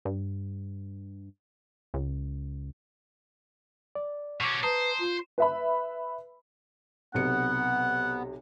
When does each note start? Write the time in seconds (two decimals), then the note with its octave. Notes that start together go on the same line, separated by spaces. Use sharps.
0.05 G2
1.94 C#2
3.95 D5
4.41 B2 C#4 C#6 D6
4.63 B4 C5 A5 A#5 D#6
4.99 F4
5.38 B4 E5 B5
7.14 B1 C3 B3 F#5 C#7